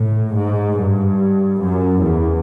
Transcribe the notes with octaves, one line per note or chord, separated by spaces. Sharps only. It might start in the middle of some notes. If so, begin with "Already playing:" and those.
Already playing: A2
G#2
G2
F#2
E2